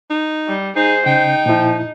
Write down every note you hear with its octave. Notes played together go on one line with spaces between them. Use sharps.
D#4
G3
D#4 G#4 C5
C#3 D#4 G5
A#2 F3 E4